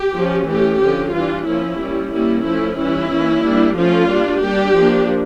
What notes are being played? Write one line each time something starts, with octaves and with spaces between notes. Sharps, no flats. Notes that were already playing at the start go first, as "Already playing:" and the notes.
Already playing: G4
F3 C#4
E3 A3 C#4 G4
D3 F3 C#4 G4
E3 G3 D4 F4
F3 A#3 C#4 E4
G3 C#4
G3 A#3 C#4 E4
F3 A3 C#4 E4
E3 G3 C#4 E4
E3 A#3 C#4
G3 A#3 D4
F3 A3 C#4 F4
G3 A#3 D4
G3 D4 G4
F3 A#3 D4